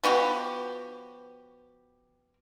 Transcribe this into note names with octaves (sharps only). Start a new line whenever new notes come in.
F3 B3 F#4 G4